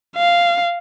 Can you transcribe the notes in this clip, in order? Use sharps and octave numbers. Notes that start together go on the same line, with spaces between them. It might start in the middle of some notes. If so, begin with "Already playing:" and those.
F5